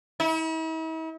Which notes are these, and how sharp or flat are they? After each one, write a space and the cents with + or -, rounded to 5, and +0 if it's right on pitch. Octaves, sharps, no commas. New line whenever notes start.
E4 -45